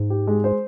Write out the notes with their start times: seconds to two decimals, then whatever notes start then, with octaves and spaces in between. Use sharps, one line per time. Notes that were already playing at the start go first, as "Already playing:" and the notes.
Already playing: G#2
0.10 G4
0.27 G#3
0.44 C5